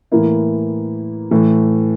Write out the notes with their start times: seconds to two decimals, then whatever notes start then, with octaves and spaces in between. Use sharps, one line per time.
0.12 A2 E3 A#3 E4
1.31 A2 E3 A3